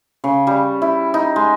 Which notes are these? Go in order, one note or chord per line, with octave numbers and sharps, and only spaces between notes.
C#3
G3
E4
D#4
G#3